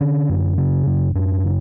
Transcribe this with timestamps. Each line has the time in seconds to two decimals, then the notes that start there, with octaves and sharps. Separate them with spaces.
0.01 D3 C#4
0.29 F#2
0.58 C#3
0.87 F#2
1.15 F#2 D4
1.44 C#3